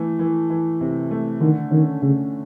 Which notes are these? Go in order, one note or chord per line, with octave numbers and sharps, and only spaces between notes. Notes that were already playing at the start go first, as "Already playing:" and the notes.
Already playing: E3 A3
E3
E3
C3
A3
D3 D#3
D#3 C#4
C#3 A3